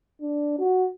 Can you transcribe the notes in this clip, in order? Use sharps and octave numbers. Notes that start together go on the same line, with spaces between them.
D4
F#4